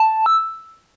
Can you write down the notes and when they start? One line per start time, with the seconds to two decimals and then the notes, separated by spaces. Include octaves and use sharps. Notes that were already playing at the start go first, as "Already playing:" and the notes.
Already playing: A5
0.26 E6